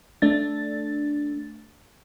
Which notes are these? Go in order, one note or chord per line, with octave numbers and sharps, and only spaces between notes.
A3 D4 A6